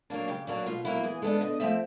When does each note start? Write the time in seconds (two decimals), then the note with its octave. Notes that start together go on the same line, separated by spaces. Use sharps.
0.10 F#3 A#3 D4
0.28 C#3 G4
0.47 F#3 A#3 D4 F#4
0.66 B2 F4
0.85 F#3 A#3 E4
1.03 E3 G#4
1.22 G#3 B3 D4 A4
1.41 D3 D#5
1.60 F3 A3 C4 E5